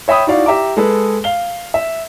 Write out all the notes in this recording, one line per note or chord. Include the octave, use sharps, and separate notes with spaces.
C#5 E5 G5 B5 D#6
D#4 E4 F#4 D5 F5
G4 E5 A#5 D6
G#3 G#4 A4 B4
F5 G7
E5